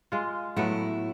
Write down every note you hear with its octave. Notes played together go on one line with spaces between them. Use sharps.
G#3 F4
A2 F#3 A3 B3 E4